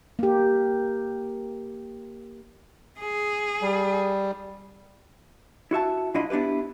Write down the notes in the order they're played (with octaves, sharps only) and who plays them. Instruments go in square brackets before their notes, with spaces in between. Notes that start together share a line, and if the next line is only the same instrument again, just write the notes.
[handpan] A#3 G4
[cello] G#4
[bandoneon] G3
[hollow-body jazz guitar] E4 F#4 E5 A5
B1 D4 E4 F4 D#5 B5
B3 D4 E4 G4 B4